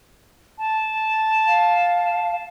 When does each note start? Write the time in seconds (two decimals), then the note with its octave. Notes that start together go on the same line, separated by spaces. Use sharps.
0.58 A5
1.47 F5